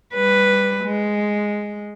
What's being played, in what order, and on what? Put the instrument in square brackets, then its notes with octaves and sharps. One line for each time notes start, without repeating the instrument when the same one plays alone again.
[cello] G3 B4
G#3